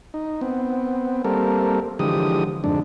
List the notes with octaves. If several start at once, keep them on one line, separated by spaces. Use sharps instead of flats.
D#4
B3 C4
G3 A#3 C4 A4 A#4
D3 E3 F3 G#3 G4 D#6
F2 G#2 D3 D4